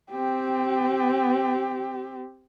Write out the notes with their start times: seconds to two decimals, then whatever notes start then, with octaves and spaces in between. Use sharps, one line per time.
0.12 C4 G4